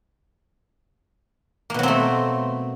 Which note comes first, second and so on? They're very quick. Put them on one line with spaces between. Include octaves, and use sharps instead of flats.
A#3 B2 F#3 C4 A3